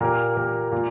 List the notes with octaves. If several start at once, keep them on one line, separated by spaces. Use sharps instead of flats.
A#2 A#3 G4 A#4
A#2 A#3 G4 A#4
A#2 A#3 F4